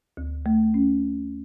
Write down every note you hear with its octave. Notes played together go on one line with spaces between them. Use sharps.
D2
A3
C#4